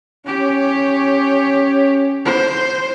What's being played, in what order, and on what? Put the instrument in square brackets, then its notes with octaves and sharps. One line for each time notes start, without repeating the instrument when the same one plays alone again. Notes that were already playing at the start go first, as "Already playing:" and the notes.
[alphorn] C#4 [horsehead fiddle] G4 C#5
[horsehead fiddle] C5